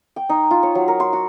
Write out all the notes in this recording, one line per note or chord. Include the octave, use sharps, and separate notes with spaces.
G5
D#4
F4
C#5
F#3
A#4
C6
F#4